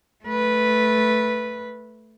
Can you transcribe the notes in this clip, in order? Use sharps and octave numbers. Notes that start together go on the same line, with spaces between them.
A3 B4